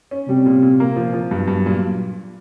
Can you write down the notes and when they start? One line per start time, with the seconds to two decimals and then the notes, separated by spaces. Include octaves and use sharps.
0.11 C#4
0.28 C3 G3
0.46 A#2
0.62 A#2
0.80 A#3
0.96 F3
1.13 F3
1.31 G2 F#3
1.48 G2
1.66 A#2